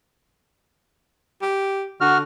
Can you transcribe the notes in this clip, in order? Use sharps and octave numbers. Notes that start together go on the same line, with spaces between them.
G4
D3 F#4 F6